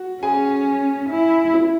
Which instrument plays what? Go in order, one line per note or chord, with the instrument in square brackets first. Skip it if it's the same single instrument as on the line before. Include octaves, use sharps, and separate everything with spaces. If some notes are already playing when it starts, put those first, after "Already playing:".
Already playing: [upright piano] F#4 F#5
[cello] C#4 [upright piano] G#4 G#5
[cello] E4
[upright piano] E4 E5